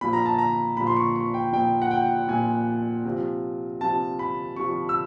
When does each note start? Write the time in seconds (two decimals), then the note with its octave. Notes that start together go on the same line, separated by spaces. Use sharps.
0.01 A#2 F3 B5
0.13 A#5
0.26 A5
0.38 A#5
0.77 A#2 F3 B5
0.87 C6
0.96 C#6
1.16 C#6
1.34 G5
1.53 A#2 F3 G5
1.82 F#5
1.91 G5
2.28 A#2 F3 G#5
3.05 C3 F3
3.81 C3 F3 A5
4.19 B5
4.56 C3 F3 C#6
4.89 E6